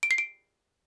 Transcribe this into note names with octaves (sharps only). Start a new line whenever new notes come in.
D7
C7
D7